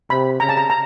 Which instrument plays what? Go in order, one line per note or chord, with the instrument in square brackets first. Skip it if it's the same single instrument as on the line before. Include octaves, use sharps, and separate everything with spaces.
[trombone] C3 [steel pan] B5
[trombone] C#3 [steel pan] A#5
[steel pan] A5
A#5
A#5